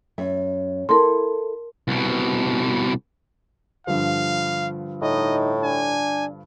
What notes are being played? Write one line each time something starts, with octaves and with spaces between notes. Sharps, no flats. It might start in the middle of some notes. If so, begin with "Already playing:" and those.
F#2 E5
E4 A4 A#4 A5 C6
C2 B2
G2 D3 F3 F5
A2 D#4 D#5
D4 G#5